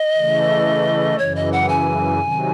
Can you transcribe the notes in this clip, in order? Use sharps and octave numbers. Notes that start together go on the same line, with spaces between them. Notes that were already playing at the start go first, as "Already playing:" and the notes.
Already playing: D#5
C#3 E3 A3
F#2 C#3 E3 C#5
D#5
F#5
G#5
C3 D#3 F#3